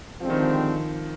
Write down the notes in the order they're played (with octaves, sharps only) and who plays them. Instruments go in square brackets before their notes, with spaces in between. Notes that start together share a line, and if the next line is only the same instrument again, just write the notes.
[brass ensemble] D3 G#3 C4 G4 [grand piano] F3
[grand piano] D#3
F3